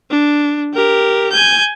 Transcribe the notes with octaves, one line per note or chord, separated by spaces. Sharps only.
D4
G4 A#4
G#5 G6